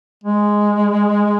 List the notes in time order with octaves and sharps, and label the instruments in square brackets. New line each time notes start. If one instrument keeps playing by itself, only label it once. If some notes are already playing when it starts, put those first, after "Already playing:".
[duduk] G#3